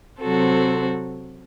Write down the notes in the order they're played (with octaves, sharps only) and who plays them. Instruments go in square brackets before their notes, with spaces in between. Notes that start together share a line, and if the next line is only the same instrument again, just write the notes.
[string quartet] C3 F#3 C4 F#4 A4